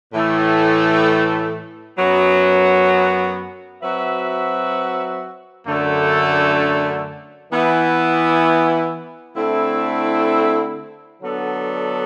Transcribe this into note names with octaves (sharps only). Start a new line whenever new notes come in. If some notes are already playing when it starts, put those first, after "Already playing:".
A2 E3 A3
F#2 F#3 B3
F#3 C4 F#4 B4 E5
F#2 D3 A3
E3 B3 E4
D3 A3 C4 E4
D3 F#3 B3 D4 A4